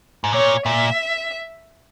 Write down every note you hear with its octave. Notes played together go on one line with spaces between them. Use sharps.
G#2
A#2 C#5
A#2 E5